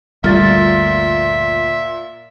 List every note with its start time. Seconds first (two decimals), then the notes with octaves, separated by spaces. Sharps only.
0.24 G1 D2 A#2 G3 E5 F6 A6